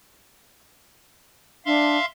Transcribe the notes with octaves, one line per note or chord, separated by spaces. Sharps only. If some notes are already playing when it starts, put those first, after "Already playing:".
D4 E5 F5 C6